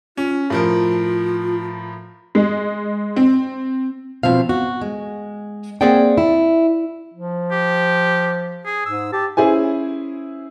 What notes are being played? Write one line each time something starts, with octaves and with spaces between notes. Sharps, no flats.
C#4 F4
A2 F3 F4 A#4
G#3
C4
B2 F3 C4 F5
F#4
G#3
A#3 C4 G#4 D5 F#5 G5
E4
F3
G4
G#4
G#2 E6
G4 A5
C#4 E4 G#4 C5 G#5